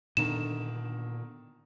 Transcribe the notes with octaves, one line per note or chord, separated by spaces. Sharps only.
A#2 D3 D#3 B3 D4 E7